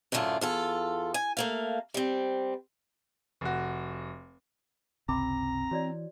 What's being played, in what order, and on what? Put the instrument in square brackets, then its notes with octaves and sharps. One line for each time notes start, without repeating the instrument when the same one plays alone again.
[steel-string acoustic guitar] F#2 A2 D3 G#3 A3 F4
E2 F4 A4
G#5
A3 A#3 F5
G3 C4
[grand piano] F1 F#4
[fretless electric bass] G1 C#2 C3 [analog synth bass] C4 [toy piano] E5 B5 D6 [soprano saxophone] A#5
[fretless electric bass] E3 [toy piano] F#4 C#5 D5